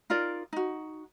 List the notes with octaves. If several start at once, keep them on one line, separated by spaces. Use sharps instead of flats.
D#4 F4 A#4 D5
D#4 F#4